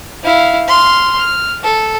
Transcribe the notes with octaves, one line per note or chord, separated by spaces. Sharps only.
E4 F5
C6 F6
F6
A4